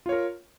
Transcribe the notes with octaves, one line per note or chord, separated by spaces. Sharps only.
F4 A#4 C#5